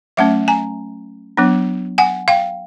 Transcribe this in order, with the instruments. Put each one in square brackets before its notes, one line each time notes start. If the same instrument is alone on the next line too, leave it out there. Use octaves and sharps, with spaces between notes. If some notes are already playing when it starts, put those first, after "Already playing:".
[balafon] F#3 A3 C#4 E5 F#5
G#5 A#5
F#3 B3 D4
F#5 G#5
F5 G5